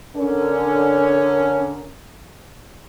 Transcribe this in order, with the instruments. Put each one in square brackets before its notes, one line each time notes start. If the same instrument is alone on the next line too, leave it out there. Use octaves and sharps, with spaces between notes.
[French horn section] D3 C#4 A#4